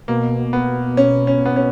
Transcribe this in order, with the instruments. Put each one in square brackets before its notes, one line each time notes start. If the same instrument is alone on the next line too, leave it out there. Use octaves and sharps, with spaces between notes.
[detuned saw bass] B2 [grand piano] A#3
[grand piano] B3
C#4
C#4
B3
C#4